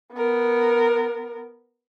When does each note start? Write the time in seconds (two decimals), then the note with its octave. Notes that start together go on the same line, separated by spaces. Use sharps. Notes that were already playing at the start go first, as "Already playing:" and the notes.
0.13 B3 A#4